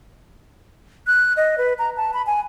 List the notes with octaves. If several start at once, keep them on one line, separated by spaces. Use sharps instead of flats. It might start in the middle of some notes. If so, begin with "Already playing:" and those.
F#6
D#5
B4
A#5
A5
B5
G#5